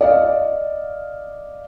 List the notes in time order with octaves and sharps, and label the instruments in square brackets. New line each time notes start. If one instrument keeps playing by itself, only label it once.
[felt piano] D5 D#5 F5